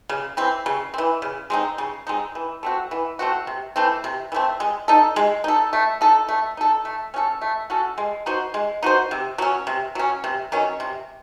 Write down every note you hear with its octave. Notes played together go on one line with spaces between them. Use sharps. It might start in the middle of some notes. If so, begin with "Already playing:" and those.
C#3
E3 C4
C#3
C4
E3
C#3
G#3 C4 D#4
C#3
G#3 C4 D#4
E3
A3 C4 F#4
E3
A3 C4 F#4
C3
E3 A3 C4
C3
E3
A3 C4
G#3
D#4 A4
G#3
D#4 A4
A3
D#4 A4
A3
D#4 A4
A3
C#4 F#4 A4
A3
C#4 F#4 A4
G#3
D#4 F#4 C5
G#3
D#4 F#4 C5
C3
F#3 C#4
C3
F#3 C#4
C3
D#3 F#3 C#4
C3